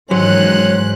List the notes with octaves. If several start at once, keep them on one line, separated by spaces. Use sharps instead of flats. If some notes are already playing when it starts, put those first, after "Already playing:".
G#2 D#3 E3 F#3 C#4 C5 F#6